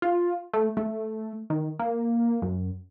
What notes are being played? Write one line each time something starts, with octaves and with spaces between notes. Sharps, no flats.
F4
A3
A3
D#3
A#3
F#2